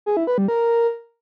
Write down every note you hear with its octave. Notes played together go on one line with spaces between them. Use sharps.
G#4
E4
B4
G3
A#4